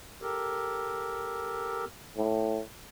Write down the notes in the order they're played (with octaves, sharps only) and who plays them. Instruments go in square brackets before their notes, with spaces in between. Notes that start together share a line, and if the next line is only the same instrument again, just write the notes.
[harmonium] G4 A4 A#4
[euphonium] A2